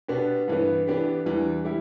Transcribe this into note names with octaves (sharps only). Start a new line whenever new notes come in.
B2 B3 D4 G4
G2 E3 B3
E3 B3 D4 G4
E2 E3 G3 D4
G3 E4 G4